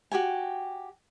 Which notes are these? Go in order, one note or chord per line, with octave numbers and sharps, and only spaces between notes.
F#4 G4 G5 G#5